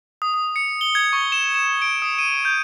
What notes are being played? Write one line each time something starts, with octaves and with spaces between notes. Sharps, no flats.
D#6
D#6
C#7
G7
G#6
C#6
E7
E7
D7
D#6
D#7
G6